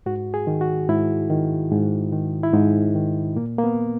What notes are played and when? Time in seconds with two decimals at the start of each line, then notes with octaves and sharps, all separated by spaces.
0.06 G#2 F#4
0.34 G#4
0.47 D#3
0.61 F#4
0.89 G#2 E4
1.30 D#3
1.71 G#2
2.12 D#3
2.43 E4
2.53 G#2 D#4
2.95 D#3
3.36 A#2 A#3
3.58 A#3
3.64 B3